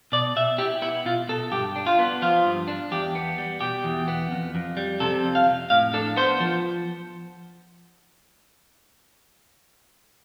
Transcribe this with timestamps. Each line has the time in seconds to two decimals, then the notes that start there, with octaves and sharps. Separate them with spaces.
0.12 B2 D5
0.36 B2 E5
0.58 E4 G4
0.82 B3 E4
1.05 B2 F4
1.29 B2 A4
1.52 G2 G4
1.76 D4
1.87 F4
1.99 B3
2.22 F3 F4
2.45 G2
2.68 D4
2.92 E2 G4
3.15 B3
3.38 G3
3.61 B2 G4
3.84 E2
4.08 B3
4.31 F2
4.55 F2
4.77 G3
5.00 C3 A4
5.23 F2
5.35 F5
5.48 F2
5.70 A2 F5
5.93 D4 A4
6.16 B3 C5
6.40 F3